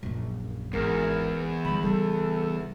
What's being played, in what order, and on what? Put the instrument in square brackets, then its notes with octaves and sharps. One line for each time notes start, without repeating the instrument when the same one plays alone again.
[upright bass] A#1 F#2
[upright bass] G#1 [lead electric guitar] E2 [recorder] A#4
[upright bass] G2 D3 [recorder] B5
[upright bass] C#3 G3 [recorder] A4